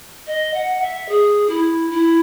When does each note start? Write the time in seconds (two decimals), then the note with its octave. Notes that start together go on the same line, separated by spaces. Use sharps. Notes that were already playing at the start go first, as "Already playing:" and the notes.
0.27 D#5
0.54 F#5
0.81 E5
1.08 G#4
1.49 E4
1.90 E4